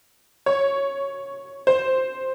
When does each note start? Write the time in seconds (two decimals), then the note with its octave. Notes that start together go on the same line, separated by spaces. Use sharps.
0.46 C#5
1.67 C5